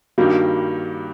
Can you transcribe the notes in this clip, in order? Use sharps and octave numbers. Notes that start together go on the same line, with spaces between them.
G2 D#3 G3 A#3 F#4